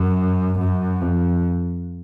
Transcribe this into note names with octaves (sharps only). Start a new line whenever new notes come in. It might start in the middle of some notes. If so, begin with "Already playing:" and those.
Already playing: F#2
F#2
F2